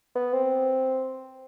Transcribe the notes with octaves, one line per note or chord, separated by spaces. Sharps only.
B3
C4